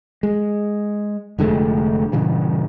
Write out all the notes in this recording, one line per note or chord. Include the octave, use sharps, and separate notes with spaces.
G#3
F1 D3 G#3 A3
G2 A#2 C#3 E3